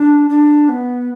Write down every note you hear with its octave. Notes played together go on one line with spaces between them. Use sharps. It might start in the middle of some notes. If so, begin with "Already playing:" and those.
Already playing: D4
D4
B3